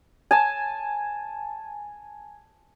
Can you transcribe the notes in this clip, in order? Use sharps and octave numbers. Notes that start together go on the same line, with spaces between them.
G#5 A5